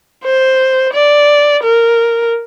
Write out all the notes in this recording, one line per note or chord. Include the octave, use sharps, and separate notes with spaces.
C5
D5
A#4